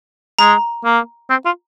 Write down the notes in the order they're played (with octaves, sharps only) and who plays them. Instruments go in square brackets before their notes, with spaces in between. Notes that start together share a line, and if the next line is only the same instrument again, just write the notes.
[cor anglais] G#3 [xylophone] A#5
[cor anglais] A#3
C4
F4